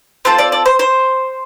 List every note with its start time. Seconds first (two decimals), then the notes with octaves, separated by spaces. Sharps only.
0.25 C4 F4 A4 C5
0.39 D5
0.52 D5
0.66 C5
0.79 C5